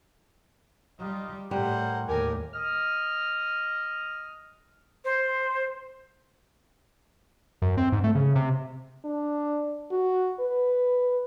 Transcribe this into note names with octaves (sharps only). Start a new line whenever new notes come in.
G3 D#4 F4 D#5
A2 G3 A#4 C5 F#5
D#2 A2 G4 A#4 G#5
D#5 D#6 F6
C5
F#2
C4
G#2
A3
C#3
C3
D4
F#4
B4